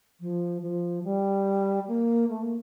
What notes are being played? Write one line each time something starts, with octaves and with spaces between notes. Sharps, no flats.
F3
F3
G3
A#3
A3
A#3